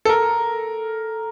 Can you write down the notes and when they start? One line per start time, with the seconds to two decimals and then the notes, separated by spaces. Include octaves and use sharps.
0.05 A4
0.09 A#4